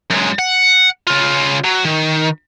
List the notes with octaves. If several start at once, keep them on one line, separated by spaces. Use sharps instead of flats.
F#2 G#3
F#5
C#3 F4
F#3
D#3